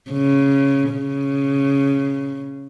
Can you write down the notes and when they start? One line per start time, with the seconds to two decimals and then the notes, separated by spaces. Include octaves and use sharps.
0.11 C#3
0.92 C#3